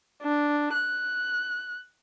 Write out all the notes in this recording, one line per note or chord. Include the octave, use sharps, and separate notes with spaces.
D4
F#6